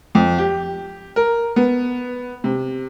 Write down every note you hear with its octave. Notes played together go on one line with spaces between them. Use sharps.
F2
G4
A#4
B3
C3